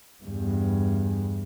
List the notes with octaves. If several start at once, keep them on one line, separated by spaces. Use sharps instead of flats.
E2 G2